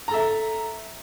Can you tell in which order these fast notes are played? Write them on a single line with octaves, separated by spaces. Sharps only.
A#5 A4 E5